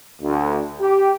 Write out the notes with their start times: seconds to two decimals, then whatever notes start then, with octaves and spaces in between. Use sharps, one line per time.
0.22 D2
0.80 G4